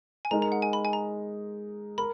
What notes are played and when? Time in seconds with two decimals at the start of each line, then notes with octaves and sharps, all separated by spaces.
0.25 G#5
0.31 G#3 D#4 A#4 A#5
0.42 A#5
0.52 F#5
0.62 G#5
0.73 B5
0.85 G#5
0.93 A#5
1.98 A#4 B5